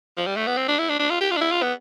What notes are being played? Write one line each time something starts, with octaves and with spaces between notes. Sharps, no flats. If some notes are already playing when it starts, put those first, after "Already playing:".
F3
G3
A3
B3
C4
D4
E4
D4
D4
F4
G4
F4
D4
E4
F4
B3